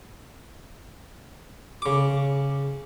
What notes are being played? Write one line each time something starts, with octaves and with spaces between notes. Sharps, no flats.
C#3 D6